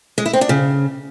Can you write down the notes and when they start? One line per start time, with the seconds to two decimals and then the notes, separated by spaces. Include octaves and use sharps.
0.18 G#3
0.26 E4
0.33 C4
0.41 D4
0.49 C#3